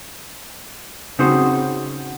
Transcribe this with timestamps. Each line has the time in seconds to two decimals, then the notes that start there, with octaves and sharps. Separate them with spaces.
1.19 C#3 C4 D#4 F#4 C5